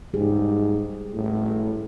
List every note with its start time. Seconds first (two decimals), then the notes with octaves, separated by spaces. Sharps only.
0.14 G#2 G3 G4 G#4
1.13 A2